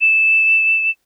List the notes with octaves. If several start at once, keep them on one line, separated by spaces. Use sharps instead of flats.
E7